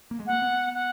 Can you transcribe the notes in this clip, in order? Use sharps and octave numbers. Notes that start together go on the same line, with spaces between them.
A#3
G#3
A#3 F#5
B3
F#5